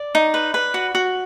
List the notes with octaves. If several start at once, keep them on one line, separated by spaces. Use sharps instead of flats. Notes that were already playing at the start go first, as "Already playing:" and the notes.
Already playing: D5
D#4
B4
B4
F#4
F#4